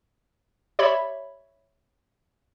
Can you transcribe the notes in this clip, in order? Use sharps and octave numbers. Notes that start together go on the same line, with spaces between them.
G4 C#5 D5 E5 B5